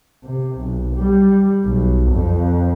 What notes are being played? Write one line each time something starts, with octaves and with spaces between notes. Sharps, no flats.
C3
B1
G3
B1
F2